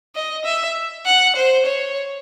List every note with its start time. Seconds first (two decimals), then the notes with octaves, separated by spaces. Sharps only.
0.15 D#5
0.45 E5
1.06 F#5
1.36 C5
1.66 C#5